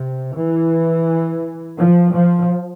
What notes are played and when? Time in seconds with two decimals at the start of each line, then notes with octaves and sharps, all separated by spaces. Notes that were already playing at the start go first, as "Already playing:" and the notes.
Already playing: C3
0.36 E3
1.78 F3
2.13 F3